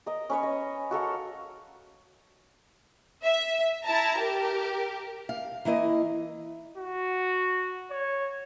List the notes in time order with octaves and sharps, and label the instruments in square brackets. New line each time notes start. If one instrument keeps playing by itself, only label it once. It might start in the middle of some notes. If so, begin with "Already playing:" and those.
[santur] A#4 D#5
C#4 B4 C#5
D#5
F#4 A4 A#4 F5
[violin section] E5
E4 A5 A#5
G4 A#4
[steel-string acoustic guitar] F5
E3 A#3 E4 D#5
[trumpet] F#4
C#5